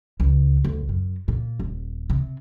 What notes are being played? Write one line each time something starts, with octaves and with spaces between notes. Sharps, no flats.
C#2
D2
F#2
A#2
D#1
C3